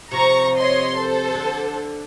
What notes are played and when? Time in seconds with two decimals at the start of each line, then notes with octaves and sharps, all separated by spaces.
0.12 C3 F3 A#5 C#6
0.57 C#5 D#5 C6
0.97 A4 C5
1.35 D3